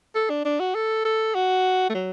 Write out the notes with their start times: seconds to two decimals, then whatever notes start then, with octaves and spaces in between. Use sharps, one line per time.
0.15 A4
0.30 D4
0.45 D4
0.60 F#4
0.75 A4
1.05 A4
1.35 F#4
1.90 A3
1.95 F#3